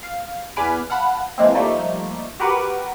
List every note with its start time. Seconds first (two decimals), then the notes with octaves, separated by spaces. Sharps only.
0.03 F5
0.56 E2 B4 G#5 B5 D6 F6
0.90 F5 F#5 A5 B5
1.38 E3 F3 G#3 A#3 C4
1.55 F3 G3 A3 A#3 D#4
2.40 F#4 G4 A#4 B4 F#5